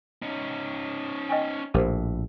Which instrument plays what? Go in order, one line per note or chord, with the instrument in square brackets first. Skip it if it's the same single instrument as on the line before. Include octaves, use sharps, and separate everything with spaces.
[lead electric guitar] C#4 D#4
[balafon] D#5 G5 G#5
[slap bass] A#1 A2 [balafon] G4 A#4 C5